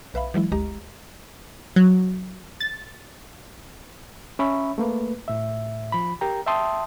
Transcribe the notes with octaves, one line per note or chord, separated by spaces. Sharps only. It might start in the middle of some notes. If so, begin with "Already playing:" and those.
B1 B4 E5 F5 B5
E3 F#3 G#3 E4
G1 D2 G#3 G4 D#5 A#5
F#3
A6
C#4 C#5 E5 B5
A3 A#3 B4
A2 E5
F3 B5
G4 A#4 G5 A#5
E5 G5 A5 C6 D#6